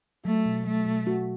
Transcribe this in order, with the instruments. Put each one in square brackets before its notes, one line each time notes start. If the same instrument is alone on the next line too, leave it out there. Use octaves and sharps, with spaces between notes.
[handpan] F#3 [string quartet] A3
[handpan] B2
[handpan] F#3 [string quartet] A3
[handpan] B2
F#4